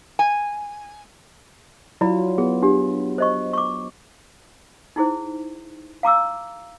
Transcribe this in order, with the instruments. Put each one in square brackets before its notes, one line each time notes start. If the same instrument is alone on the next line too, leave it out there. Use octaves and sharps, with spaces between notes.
[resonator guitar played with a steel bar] G#5
[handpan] F#3 F4 [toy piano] E4 D5 B5
[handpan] B3 [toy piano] G#4
[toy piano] D4 G4
C5 D#5 C#6
C#6 D6
D#4 E4 G#4 C5
F5 A#5 D6 E6